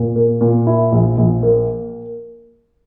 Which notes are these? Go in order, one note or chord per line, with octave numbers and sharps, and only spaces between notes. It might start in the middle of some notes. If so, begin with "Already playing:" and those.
Already playing: A#2
A#3
A#2
E4
A#1
A#1
A#3